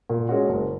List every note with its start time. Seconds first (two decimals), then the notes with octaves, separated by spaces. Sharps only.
0.10 A#2
0.29 G#3 C#4 F#4
0.49 F#1